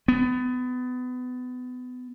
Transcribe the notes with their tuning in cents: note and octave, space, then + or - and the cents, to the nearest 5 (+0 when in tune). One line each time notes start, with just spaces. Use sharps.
B3 +25